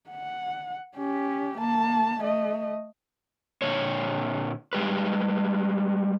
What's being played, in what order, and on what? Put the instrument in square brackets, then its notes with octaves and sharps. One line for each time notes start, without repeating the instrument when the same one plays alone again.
[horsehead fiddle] F#5
C#4 G4
A#3 A5
A3 D#5
[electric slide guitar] A#2 D3 A#3 C#5
G3 G#3 G4 B4